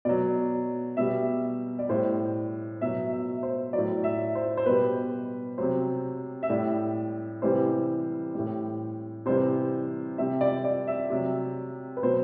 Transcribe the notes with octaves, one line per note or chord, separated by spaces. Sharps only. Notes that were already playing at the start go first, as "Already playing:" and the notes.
B2 F#3 D5
B2 G3 E5
D5
A2 G3 C5
B2 F#3 E5
E5
C5
A2 F#3 D5
E5
C5
C5
B2 G3 B4
C3 F#3 C5
E5
A2 G3 D5
C3 E3 G3 C5
A2 G3
C3 E3 G3 C5
C3 G3 E5
D5
D5
E5
C3 F#3
B4
B2 F#3 C5